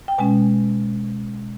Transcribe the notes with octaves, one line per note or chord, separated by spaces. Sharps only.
G5
B2 G#3 C#4 G#5